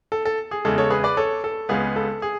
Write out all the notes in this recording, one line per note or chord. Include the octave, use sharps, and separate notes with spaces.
A4
A4
G#4
E2 C#3 G#3 A4
A4 C#5
G#4 B4
B4 D5
A4 C#5
A4
C#2 C#3 G#3 B3 G#4
A4
G#4